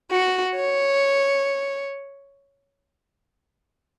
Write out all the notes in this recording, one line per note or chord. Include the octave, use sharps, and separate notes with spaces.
F#4
C#5